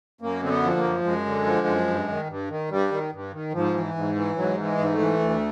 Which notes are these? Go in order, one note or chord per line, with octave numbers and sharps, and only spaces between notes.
F#2 A#3
D3 C4
B3
F3
A#3
F#2
F#2 G#3
D3
F3
F#2
G2
D#3
G2
D#3
G2 G3
D#3
G2
D#3
G#2 F3
E3
G#2
E3
G#2 F#3
E3
G#3
G#2
A3
E3
D2